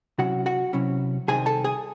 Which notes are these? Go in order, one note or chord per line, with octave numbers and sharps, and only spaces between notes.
C3 F#3 C#4 E4 F#4 F#5
F#4 F#5
C3 F#3 C#4 E4
C2 C3 D#3 C4 G#4 G#5
A4 A5
G#4 G#5